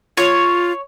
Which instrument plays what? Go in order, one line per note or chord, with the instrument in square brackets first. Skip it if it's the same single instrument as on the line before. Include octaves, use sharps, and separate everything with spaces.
[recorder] F4 [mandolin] C#5